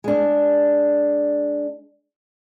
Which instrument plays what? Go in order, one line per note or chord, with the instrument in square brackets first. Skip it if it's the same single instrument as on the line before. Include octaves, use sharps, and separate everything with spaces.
[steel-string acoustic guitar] G#3 D4